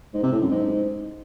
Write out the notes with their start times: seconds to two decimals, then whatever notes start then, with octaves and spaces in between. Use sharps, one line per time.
0.14 G#2
0.23 C3
0.32 A2
0.41 F#2
0.51 G#2